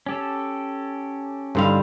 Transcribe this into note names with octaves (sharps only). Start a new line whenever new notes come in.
C#4 G4 A4
G2 D3 G3 D#4 C5 F5